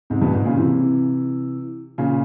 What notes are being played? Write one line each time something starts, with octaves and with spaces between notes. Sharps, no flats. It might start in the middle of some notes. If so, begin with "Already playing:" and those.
G#2 C3
G2 A#2
G#2
A#2 C#3
C3 E3
A#2 C#3